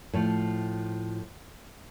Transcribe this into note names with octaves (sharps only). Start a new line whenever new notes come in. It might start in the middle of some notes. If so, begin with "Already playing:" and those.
A2 F3